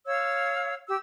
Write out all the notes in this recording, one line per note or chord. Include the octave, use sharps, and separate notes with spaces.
C#5 F5 E6
G4 E6